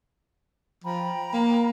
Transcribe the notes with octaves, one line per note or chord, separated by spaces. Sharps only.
F3 G5 A#5 B5
A#3